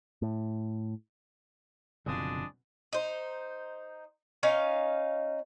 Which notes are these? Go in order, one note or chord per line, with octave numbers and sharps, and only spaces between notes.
A2
F#1 B2 D3 F3 G#3 C4 D4 D#6
D#4 C5
C#4 D#4 F5